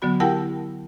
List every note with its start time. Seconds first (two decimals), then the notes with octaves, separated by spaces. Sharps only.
0.02 D3 F#3 B3 F#4 B5
0.20 E4 G4 A#4 F#5 G5 A5